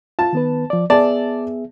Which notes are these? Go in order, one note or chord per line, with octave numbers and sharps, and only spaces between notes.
F4 A5
D#3 B3 B4
F3 D5
B3 G#4 D5 E5 A5